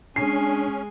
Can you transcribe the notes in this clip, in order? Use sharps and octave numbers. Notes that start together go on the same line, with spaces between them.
G#3 C#4 D4 G#5 C7